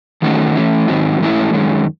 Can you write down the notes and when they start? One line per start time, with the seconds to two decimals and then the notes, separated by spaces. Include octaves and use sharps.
0.22 E2 D#3 A3 C#4 F#4
0.56 E3 A3 C#4 E4
0.88 G#2 D#3 F#3 C4
1.20 G#2 E3 A3 C#4 E4
1.53 F#2 D#3 G#3 C#4